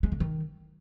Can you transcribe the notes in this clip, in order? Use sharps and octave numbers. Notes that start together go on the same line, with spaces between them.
G#3
D3
D#3